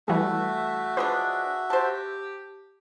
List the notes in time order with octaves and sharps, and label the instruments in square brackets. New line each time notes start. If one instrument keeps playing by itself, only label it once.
[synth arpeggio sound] E3 G3 [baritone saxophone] A3 [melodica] F#4 E5
[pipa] F3 G#3 D4 [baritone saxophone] G#4 [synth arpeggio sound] B4
[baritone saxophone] G4 [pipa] C5 A5